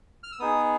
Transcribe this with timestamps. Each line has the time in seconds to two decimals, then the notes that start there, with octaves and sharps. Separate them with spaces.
0.24 F6
0.32 E6
0.39 B3 D#4 G#4 D#6